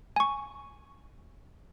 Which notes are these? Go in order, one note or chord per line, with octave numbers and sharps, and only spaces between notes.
G#5 C#6